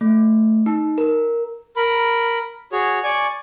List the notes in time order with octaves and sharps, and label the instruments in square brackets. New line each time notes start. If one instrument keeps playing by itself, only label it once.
[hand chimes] A3
D#4
A#4
[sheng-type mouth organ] A#4 B5
F#4 G#4 C#5
D5 G#5 C#6